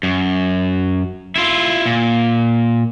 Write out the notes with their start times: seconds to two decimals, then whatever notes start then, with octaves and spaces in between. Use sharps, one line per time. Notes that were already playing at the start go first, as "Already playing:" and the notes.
0.03 F#2
1.36 E4 F4
1.86 A#2